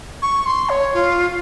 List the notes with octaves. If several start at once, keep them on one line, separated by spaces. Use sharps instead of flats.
C#6
C6
C#5
F4